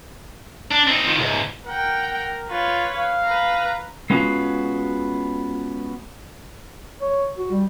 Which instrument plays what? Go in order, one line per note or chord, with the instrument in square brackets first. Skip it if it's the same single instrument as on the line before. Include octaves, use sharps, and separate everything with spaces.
[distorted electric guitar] D4
C4 D#4
D#3 F3
C#2 G#2
[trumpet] A#4 [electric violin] F#5 G5
[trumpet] F4 [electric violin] B4 C#5
[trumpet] F5
[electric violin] B4 A#5
[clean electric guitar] G#3 B3 C#4 F4 F#4
[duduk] C#5
F#4
G3